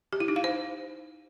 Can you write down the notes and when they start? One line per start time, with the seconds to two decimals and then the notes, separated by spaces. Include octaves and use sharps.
0.13 G4
0.20 E4
0.28 D#4
0.36 F5
0.44 C5